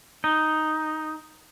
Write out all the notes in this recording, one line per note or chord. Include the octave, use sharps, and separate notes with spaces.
D#4